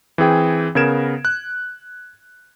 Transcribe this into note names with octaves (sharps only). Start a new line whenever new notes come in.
E3 C4 G#4 G5
C#3 B3 A#4 G#6 D7 E7
F#6